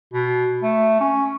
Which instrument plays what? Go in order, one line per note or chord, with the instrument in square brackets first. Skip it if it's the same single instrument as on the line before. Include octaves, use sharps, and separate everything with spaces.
[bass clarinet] B2
A3
C#4